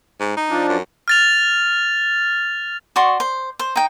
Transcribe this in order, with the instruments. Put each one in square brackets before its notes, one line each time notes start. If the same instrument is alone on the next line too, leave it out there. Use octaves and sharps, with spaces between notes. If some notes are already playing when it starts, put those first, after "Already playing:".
[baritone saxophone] G#2
D#4
[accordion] F3 D4
[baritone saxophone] F#2
[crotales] F6 A6 F7
[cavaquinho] F#4 D5 C6 C#6
C5
C5
D#4 G5